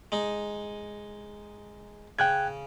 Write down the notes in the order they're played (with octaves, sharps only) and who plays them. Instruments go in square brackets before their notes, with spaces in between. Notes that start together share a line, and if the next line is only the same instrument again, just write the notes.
[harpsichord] G#3 D#4
[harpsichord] C#3 [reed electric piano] G5 F#6 G#6